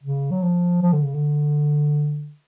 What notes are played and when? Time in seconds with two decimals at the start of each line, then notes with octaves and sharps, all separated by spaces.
0.03 C#3
0.31 F#3
0.43 F3
0.82 F3
0.93 D3
1.03 C#3
1.14 D3